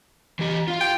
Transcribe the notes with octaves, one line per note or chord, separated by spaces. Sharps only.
E3 G4
F4 F5
G5